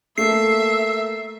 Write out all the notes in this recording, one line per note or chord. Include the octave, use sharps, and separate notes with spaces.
A3 A#3 E5 C7